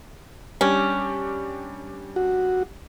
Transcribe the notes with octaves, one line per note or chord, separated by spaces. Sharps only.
G3 C#4 D4 G4
F#4